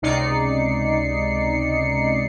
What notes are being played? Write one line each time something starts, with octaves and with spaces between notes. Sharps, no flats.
C#2 C3 D#4 D5 C7 C#7